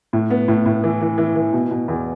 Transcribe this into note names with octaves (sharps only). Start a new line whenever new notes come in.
A2
B3
A2
A2
E3
E3
E3
E3
B2
B2
E2